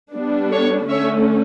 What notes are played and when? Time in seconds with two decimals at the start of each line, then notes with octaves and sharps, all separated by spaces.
0.12 G3 B3 D4
0.51 A4 C#5
0.89 D3 A3 C#4 C#5 E5